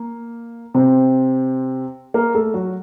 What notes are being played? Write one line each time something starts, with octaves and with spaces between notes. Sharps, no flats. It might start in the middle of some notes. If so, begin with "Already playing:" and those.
Already playing: A#3
C3 C4
A#3 A#4
A3 A4
F#3 F#4